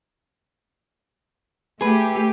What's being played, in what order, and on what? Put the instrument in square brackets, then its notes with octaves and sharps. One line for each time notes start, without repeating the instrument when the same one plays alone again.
[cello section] A3 G4 [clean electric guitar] G#4 B4